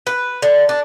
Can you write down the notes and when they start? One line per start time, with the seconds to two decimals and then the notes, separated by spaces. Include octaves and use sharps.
0.07 B4
0.42 D3
0.69 D4